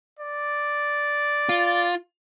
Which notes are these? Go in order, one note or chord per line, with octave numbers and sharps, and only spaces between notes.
D5
F4